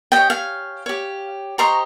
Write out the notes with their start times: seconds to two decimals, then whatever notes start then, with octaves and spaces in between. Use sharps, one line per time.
0.12 G4 C#5 D#5 G5
0.30 F5 G#5
0.86 G4 C#5
1.58 G4 C5 D#5 A#5 C#6